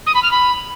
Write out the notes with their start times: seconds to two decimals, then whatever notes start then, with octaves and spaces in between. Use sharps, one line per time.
0.06 D#6
0.14 B5
0.23 F6
0.31 B5